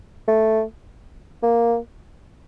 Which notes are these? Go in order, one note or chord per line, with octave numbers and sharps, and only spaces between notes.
A3
A#3